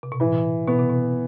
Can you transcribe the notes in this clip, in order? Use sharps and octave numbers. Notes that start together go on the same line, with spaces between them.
C3
B2
A2 E3
B2 B3
C3
B2